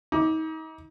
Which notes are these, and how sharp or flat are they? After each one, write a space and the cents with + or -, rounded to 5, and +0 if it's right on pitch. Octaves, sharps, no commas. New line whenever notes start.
D#4 +35 D6 +0